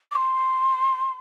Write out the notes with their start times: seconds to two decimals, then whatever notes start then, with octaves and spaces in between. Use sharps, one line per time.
0.11 D6
0.15 C6